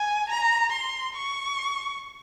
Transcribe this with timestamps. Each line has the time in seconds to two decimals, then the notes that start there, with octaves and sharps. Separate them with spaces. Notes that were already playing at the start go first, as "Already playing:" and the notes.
Already playing: G#5
0.29 A#5
0.72 C6
1.17 C#6